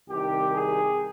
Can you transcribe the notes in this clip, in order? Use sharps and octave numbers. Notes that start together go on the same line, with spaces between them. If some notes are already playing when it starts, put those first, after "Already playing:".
C2 C3 D#3 G4
G#4